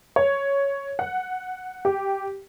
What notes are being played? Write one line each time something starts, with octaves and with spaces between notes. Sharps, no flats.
C#5
F#5
G4